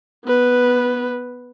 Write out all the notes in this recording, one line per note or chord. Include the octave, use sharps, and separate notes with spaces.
B3 B4